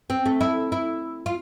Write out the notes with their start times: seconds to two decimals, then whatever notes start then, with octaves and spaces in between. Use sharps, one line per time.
0.10 C4
0.26 A3
0.41 E4
0.72 E4
1.26 F4